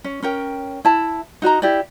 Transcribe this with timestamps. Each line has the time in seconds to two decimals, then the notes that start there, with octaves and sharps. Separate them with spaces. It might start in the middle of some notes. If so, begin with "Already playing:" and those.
0.04 C#4
0.22 C#4 A#4 G5
0.85 E4 A5
1.42 D#4 F#4 D#5 A#5
1.62 E4 G4 D5